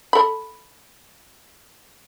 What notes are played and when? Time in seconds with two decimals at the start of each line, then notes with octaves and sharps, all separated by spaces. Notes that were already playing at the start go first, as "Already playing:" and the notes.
0.13 A4 B5